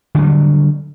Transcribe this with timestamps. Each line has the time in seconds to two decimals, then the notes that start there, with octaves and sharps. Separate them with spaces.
0.15 D3
0.19 F#3
0.22 G3